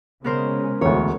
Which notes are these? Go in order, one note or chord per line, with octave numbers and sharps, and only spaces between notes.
C#3 G#3 B3 C#4 A#4 C5
E1 D2 C#5